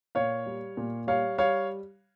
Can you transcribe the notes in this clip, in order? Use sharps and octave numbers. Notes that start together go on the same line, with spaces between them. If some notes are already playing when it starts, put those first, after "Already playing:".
A#2 C#5 F5
G3
A#2
G3 C#5 F5
G3 C#5 F5